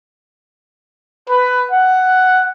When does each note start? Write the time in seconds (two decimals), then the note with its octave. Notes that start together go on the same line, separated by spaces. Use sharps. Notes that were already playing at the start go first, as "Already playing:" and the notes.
1.28 B4
1.71 F#5